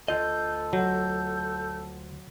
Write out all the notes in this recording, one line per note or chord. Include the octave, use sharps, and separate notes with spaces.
D2 F4 A4 D#5 G6
F#3 G6